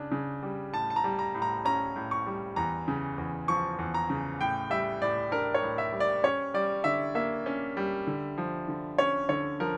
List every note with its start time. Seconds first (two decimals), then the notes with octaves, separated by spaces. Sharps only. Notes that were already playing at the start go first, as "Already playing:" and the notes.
Already playing: C#3 D4
0.12 C#3
0.43 G3
0.73 A2 A5
0.90 A5
0.96 A#5
1.04 G3
1.19 A#5
1.35 A2
1.42 A#5
1.65 C#4 A#5
1.96 A2
2.11 C#6
2.26 G3
2.56 E2 A#5
2.88 C#3
3.18 E2
3.48 F3 C#6
3.79 E2
3.94 A#5
4.10 C#3
4.41 A2 G5
4.70 G3 E5
5.02 A2 D5
5.31 D4 A#4
5.54 C#5
5.63 A2
5.78 E5
5.92 G3
6.00 D5
6.24 C#4 C#5
6.54 G3 D5
6.84 D3 E5
7.15 A#3 E5
7.46 C#4
7.77 G3
8.07 D3
8.38 F3
8.68 D3
8.98 C#4 C#5
9.29 D3 C#5
9.60 F3 A#4